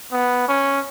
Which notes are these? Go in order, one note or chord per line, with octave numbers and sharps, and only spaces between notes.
B3
C#4